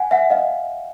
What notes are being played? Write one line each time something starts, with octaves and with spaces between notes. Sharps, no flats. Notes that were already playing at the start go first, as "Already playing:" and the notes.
Already playing: F#5 G#5
E5 F#5
D#5 F5